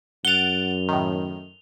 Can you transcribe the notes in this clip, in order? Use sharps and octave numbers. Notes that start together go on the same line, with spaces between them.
F#2 F#5 A6 D7 F7 G7
A2 D#3